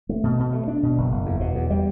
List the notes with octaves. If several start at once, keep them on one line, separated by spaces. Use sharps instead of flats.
A3
B2
B2
A3
D4
B2
F#1
F#1
E2
B2
E2
G3